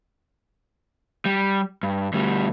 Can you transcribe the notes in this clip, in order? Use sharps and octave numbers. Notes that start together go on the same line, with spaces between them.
G3
G2
D2 G3